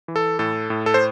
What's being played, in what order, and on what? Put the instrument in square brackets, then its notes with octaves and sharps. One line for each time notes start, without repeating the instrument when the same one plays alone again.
[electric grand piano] E3
A4
A2 A4
A2
A4
C5